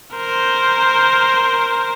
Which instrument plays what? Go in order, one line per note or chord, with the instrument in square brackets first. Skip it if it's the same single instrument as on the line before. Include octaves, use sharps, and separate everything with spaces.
[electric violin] A#4 C5